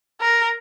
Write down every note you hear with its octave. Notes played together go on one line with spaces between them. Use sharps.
A#4